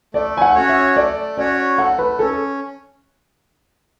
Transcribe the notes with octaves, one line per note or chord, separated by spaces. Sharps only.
A3 D5
G#5
F#5
C#4 F#4 C#5
E5
A3 D5
C#4 F#4 C#5 D5
A3 F#5
B4
C#4 A4